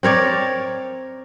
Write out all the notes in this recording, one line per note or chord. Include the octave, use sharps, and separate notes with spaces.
C4 A#4 C#5 D5